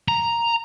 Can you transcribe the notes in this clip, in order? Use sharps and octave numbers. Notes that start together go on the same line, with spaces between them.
A#5